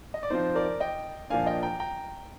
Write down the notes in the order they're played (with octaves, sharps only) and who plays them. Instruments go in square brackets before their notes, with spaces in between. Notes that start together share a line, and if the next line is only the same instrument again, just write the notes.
[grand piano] D#5
D5
F3 C4 D#4 C5
A#4 D5
D#5 G5
A#2 F3 A#3 D4 F5 G#5
D#5 G5
G5 A#5
G5 A#5